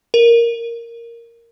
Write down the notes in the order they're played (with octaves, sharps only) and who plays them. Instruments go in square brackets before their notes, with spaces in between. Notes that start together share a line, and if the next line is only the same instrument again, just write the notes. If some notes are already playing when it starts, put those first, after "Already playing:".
[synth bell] A#4